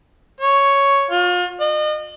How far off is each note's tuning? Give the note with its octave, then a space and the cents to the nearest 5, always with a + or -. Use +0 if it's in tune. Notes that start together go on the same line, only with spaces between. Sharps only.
C#5 +5
F4 +35
D#5 -35